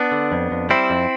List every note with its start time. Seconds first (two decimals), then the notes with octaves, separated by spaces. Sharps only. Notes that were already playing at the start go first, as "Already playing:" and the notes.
Already playing: B3 D4
0.12 D3
0.32 F2
0.51 F2
0.70 G3 C4 E4
0.90 F2